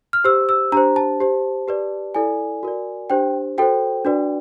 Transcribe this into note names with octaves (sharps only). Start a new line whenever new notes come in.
F6
G4 C5 E6
E6
D4 G4 C5 A#5
A5
G4 C5
G4 B4 D5
E4 A4 D5 G#5
F#4 A#4 D5
D4 G4 C5 G5
F#4 A4 C5 G5
D4 F#4 B4 D5